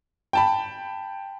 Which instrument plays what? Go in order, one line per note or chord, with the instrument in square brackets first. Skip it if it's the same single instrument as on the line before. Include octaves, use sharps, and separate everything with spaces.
[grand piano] G5 A5 B5